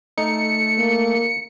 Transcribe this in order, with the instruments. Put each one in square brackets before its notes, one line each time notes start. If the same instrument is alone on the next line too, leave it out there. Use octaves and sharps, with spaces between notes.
[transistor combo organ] A3 [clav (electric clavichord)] D#4 [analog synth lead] C#7
[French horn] A#3